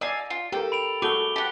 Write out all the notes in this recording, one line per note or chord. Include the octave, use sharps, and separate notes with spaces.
D5 D#5 F5 G#5 E6
F4
G4 A4 A#4 G5
B5 D7 F7
A3 F#4 G#4 A4 D6 G7
G4 F#5 A5